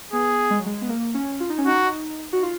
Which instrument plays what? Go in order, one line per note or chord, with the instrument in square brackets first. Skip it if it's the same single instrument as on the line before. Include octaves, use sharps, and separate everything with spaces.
[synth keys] B3 [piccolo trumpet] G#4
[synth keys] G#3
F#3
G#3
B3
A#3
C#4
F4
D#4
C#4
[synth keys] D#4 [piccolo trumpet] F#4
[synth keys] F#4
F4